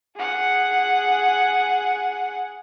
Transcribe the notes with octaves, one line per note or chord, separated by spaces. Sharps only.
G#4 F#5